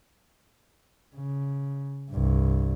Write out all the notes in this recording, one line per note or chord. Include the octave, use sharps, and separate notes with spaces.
C#3
C2 G2